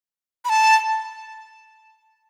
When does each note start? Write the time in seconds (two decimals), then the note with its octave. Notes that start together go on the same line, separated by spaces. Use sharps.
0.45 B5
0.49 A5